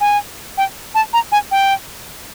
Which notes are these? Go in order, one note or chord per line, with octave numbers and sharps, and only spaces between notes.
G#5
G5
A5
A#5
G#5
G5